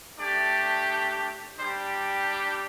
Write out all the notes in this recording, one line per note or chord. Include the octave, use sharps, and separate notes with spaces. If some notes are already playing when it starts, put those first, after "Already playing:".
A3 D4 G4 D5
G3 D4 G4 C5